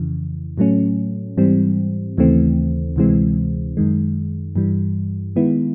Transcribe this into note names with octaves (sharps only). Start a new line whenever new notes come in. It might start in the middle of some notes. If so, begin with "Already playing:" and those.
Already playing: F2 C#3 E3
A2 F#3 A3 C#4
G#2 E3 G3 C4
D#2 C#3 E3 A3 C4
D2 C3 E3 G#3 C4
F#2 D#3 G#3
G2 E3 G3
D#3 G#3 B3 E4